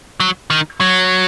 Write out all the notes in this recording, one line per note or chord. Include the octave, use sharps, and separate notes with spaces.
F#3
D#3
F#3